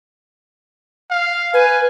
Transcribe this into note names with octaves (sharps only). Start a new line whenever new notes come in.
F5
B4 G#5